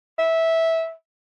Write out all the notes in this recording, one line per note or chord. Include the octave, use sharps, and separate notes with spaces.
E5